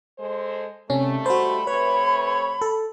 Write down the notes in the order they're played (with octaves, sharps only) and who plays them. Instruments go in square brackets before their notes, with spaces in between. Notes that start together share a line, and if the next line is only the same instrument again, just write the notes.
[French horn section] G#3 A4 C5
[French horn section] D#2 G3 A3 [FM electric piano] C3 C#4
[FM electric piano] F#4 C5 [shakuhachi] B5
[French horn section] C3 A3 C#5 [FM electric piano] B4
[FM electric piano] A4